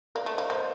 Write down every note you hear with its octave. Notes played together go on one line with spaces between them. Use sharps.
A#3 A#4 D5
A3
C5 D#5
A#3
A#3 C5 D#5